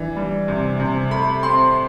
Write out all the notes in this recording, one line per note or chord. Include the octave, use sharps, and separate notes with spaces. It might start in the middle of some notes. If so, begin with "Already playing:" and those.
Already playing: E3 D4
G3
C3
C3
A3 B5
C4 C6